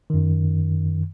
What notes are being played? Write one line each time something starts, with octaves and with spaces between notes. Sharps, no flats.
F#2 D#3